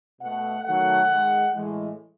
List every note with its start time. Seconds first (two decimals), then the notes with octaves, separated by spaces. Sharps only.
0.21 B2 A3 F#5
0.65 D#3 F#3 A3 F#5
1.09 D#3 G#3
1.54 A2 E3 G#3